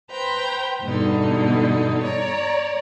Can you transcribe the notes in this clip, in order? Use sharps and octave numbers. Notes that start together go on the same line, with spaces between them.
B4 C5 G5 A#5
E2 G2 B2 D3 D#4
C#5 D5 A#5